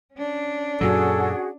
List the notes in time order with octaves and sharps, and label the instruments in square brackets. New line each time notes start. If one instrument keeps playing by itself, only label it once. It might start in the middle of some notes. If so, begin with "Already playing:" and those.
[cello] C#4 D4
[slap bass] F#2 A#2 F#3 [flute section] F#4 G#4 F#5 [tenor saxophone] A4